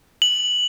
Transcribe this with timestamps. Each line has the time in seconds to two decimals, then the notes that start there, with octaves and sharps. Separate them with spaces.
0.22 F#7